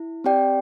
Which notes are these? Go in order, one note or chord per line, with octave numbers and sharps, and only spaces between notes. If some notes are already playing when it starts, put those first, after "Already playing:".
Already playing: E4
C4 G4 D5 G5